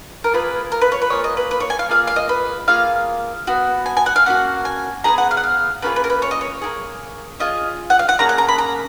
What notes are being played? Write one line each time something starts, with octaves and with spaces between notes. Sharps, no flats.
A#4
A#3 F4 G#4 B4
A#4
B4
C#5
B4
A#3 F4 G#4 C#5
D#5
B4
B4
C#5
G#5
F5
A#3 F4 G#4 F5
F5
D#5
B4
A#3 F4 G#4 F5
B3 F#4
G#5
G#5
F#5
F5
A#3 C#4 F#4 F#5
G#5
B3 D#4 G#4 A#5
F#5
F5
F#5
F5
A#3 C#4 F4 G#4 B4
B4
A#4
B4
C#5
D#5
C#5
A#3 F4 G#4
C#4 F4 G#4 D#5
F#5
F5
F#5
A#3 C#4 G#4 A#5
F#5
A#5
B5
A#5